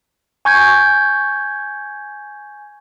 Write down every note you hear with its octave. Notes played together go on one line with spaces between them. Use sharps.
G#5 C#6 G6 G#6